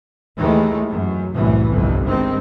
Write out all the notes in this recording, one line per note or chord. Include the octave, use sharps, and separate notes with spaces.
D#2 D#3 E3 G#3 A3
F#2
C2 F#2 A2 E3
G1 C2 F2
G2 D#3 G#3 C4